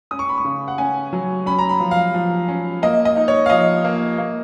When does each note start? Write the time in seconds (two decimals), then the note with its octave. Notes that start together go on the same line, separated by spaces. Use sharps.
0.11 C#4 D#6
0.19 C#6
0.29 B5
0.38 C#6
0.45 C#3
0.68 F#5
0.78 C#4 G#5
1.13 F#3
1.46 C#4 B5
1.58 A#5
1.69 B5
1.80 F3
1.91 F5
2.14 F3
2.48 C#4
2.82 A#3 D#5
3.05 D#5
3.16 D#4
3.28 C#5
3.46 F5
3.50 F3 D#5
3.84 A#3
4.18 A#3